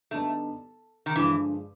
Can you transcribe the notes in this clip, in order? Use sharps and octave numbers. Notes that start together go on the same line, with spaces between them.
D3 G3 A3 B3 D#4
D#3
G2 D3 E3 F3 G#3